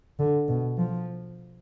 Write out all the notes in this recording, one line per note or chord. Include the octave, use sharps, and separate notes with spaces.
D3
B2
F3